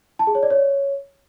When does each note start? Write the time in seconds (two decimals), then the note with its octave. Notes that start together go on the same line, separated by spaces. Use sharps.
0.19 A5
0.27 G#4
0.35 C#5
0.43 D5
0.50 C#5